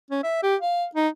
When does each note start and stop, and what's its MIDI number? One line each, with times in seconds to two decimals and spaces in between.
0.11 0.22 61
0.24 0.39 76
0.43 0.55 67
0.61 0.86 77
0.95 1.08 63